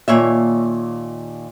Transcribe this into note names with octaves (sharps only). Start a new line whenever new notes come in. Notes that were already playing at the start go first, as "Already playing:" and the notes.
D#2 A#2 C#5 E5